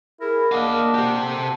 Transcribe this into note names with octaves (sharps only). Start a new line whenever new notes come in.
E4 G#4 A#4
A#3 D4 D#5 F5 F#5
A#4
G4 C5 F#5
A4